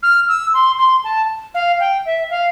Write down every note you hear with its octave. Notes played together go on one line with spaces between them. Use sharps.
F6
E6
C6
C6
A5
F5
G5
E5
F5